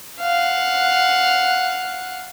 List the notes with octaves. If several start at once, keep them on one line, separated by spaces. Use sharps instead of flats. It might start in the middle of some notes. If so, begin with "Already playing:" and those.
F5 F#5